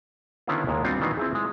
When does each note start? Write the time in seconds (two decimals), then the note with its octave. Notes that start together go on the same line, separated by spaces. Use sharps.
0.47 D3 D#3 B3 C#4 E4 F4
0.67 D#2 A#2 G#3
0.84 G3 B3 C4 D4 F4 F#4
1.01 D#3 E3 F#3 B3 D#4 F4
1.17 C4 E4 G#4
1.35 G#3